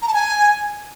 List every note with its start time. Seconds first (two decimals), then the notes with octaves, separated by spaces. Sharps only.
0.02 A#5
0.08 A5
0.14 G#5